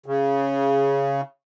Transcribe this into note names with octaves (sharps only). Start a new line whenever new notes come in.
C#3